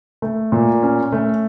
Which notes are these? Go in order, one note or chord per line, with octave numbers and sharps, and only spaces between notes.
A3
A#2
C#4
A3